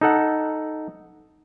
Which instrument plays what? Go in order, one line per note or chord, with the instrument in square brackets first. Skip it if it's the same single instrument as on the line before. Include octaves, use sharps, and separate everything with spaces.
[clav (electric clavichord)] D#4 A4 F#5